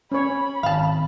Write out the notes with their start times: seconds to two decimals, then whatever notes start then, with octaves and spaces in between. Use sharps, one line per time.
0.12 C#4 C#5 B5
0.63 G#1 F5 A5